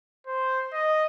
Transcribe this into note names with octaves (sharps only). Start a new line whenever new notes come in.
C5
D#5